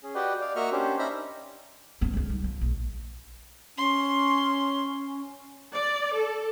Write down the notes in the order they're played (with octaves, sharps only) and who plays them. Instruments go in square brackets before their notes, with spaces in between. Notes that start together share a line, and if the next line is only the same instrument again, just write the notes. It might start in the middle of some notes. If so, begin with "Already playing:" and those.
[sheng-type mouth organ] C#4 G#4
F#4 G4 B4 D5 D#5 G5
D5 F5
A#3 F#4 D#5 E5 C#6 F6
C#4 D4 G4 C5
C#4 D#4 E5 A#5 B5 F6
[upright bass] B3 C#4
C#2 D#3
G3
F3
A#1
[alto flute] C#4 [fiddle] C6
[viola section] D5
A4